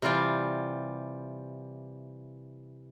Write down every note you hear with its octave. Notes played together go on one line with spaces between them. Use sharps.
C3 E3 G3 F4 D5 G#5